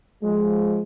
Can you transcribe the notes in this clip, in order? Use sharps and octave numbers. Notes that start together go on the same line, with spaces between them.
F3 G#3